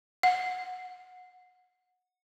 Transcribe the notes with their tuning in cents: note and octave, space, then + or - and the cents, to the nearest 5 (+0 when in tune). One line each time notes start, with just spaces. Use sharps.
F#5 -20